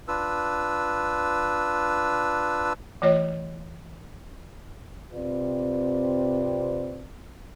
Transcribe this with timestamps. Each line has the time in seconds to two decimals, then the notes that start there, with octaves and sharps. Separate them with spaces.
0.08 D4 F4 B4 E6
3.02 E3 A3 F4 C#5 D#5
5.13 C3 C4 F4 B4 D5